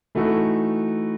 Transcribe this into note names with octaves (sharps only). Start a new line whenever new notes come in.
E3 A3 D#4 F#4 A4